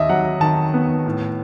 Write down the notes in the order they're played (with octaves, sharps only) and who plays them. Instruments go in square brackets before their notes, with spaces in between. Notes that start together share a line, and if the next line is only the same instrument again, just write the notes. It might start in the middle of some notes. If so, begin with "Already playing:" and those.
Already playing: [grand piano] D#2 D#5 E5
F#3 F#5
D#3 A5
B3
A2